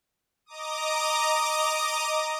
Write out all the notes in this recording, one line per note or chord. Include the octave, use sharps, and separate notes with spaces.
D#5 A#5 D6 D#6